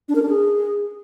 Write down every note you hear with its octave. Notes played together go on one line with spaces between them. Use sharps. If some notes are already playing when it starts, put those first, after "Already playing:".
D4
A#4
D4
G#4